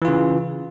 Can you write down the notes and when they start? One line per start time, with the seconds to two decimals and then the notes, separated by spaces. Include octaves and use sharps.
0.02 E3
0.05 F4
0.08 C#3